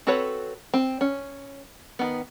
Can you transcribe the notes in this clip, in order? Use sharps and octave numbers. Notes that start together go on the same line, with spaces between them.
C4 F#4 A4 B4 C#5
C4
C#4
D#3 B3